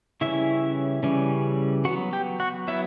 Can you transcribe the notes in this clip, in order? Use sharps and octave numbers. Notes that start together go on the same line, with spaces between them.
C#3 E3 G3 C#4 E4 E5
C#3 E3 G3 C#4
F#3 B3 F#4 F#5
G4 G5
F#4 F#5
F#3 B3 E4 E5